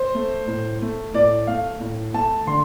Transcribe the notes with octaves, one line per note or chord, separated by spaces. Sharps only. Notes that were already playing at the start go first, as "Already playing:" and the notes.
Already playing: C5
A3
A2
A3
A2 D5
A3 F5
A2
A3 A5
D3 C6